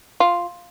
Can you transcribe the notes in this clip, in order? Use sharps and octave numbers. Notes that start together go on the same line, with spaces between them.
F4